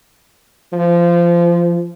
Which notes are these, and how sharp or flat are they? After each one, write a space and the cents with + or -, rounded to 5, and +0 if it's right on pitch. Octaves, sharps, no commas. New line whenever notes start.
F3 -20